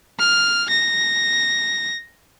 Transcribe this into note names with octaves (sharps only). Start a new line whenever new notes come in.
F6
A#6